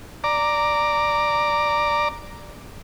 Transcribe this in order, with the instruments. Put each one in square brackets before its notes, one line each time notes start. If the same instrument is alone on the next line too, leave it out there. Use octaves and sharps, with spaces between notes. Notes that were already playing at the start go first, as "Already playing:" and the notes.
[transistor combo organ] D5 A#5 D6